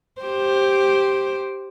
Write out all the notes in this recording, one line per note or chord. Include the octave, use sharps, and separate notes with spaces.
G4 C5